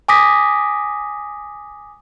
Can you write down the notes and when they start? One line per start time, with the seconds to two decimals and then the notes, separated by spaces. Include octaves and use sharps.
0.09 G#5 D6 D#6 A#6 B6